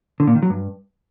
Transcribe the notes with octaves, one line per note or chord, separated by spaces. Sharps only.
D3
A#2
D#3
F#3
G2